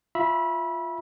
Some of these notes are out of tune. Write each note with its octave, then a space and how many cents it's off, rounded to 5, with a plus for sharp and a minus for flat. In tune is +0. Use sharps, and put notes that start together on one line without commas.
F4 +0 E5 +0 B5 -25